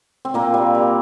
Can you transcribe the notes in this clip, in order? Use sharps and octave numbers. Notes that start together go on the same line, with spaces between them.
C4
A#2 A#3
G3
G3